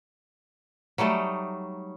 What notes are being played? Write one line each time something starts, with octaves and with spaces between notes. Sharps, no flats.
F#3 G3 A3 D#4